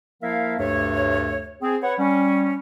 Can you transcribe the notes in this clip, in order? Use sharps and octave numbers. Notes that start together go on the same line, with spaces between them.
F3 A#3 E4 A#4 E5 F5
D2 G2 C3 A3 A4 C#5
C4 G#4
B4 C#5 F#5
G3 C#4